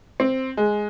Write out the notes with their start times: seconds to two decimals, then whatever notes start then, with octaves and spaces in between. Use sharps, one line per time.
0.20 C4
0.57 G#3